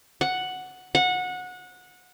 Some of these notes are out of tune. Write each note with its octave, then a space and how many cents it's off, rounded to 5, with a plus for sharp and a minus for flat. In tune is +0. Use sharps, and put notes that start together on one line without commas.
F#5 +0
F#5 -20